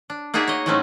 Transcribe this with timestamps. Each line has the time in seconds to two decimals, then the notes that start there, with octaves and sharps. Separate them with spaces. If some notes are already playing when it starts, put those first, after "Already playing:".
0.10 D4
0.34 A#3 D#4 F#4 G#4 D5 E5
0.48 C#5 D#5
0.66 A2 F#3 A3 C4 C#4 D#4